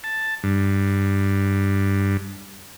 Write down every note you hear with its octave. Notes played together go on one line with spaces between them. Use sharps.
A5
G2